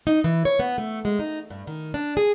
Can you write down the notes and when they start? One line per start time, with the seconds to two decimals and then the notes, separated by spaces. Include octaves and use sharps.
0.07 D#4
0.24 E3
0.45 C#5
0.59 B3
0.78 A3
1.05 G#3
1.19 D#4
1.50 G2
1.67 D#3
1.94 D4
2.17 G#4